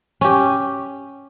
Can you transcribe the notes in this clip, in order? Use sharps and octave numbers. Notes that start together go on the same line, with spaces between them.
C#4 G4